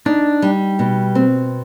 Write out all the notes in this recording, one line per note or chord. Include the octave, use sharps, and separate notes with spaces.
D4 D#4
G3
B2
C4